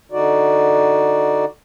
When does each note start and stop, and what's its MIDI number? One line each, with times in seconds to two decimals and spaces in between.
0.12 1.45 50
0.12 1.45 63
0.12 1.45 66
0.12 1.45 74